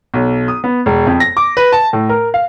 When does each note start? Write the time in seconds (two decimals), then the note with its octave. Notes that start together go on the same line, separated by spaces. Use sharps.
0.14 B1
0.48 D#6
0.64 B3
0.86 E1
1.07 F2
1.20 A#6
1.37 D6
1.57 B4
1.73 A5
1.93 A2
2.09 A#4
2.34 F5